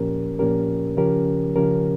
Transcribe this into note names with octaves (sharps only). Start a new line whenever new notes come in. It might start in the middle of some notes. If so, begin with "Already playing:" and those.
Already playing: A#2 F3 C#4 G4 A#4
A#2 F3 C#4 G4 A#4
C#3 F3 C#4 G4 A#4
C#3 F3 C#4 G4 A#4